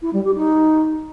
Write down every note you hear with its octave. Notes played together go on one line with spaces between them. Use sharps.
E4
G3
G4
D#4